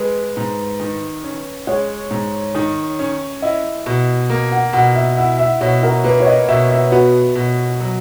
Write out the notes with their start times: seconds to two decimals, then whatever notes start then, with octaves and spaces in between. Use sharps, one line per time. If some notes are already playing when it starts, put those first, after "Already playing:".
Already playing: G#3 B4
0.37 G#2
0.80 D#3
1.24 C#4
1.67 G#3 C#5
2.11 G#2
2.55 D#3
2.99 C#4
3.42 E4 D#5
3.86 B2
4.30 A#3
4.52 F#5
4.73 B2 F#5
4.95 E5
5.17 E4 F#5
5.39 E5
5.61 B2 C#5
5.83 A#4
6.04 A#3 B4
6.20 C#5
6.27 D#5
6.49 B2 E5
6.71 E5
6.92 B3 F#4
7.35 B2
7.80 F#3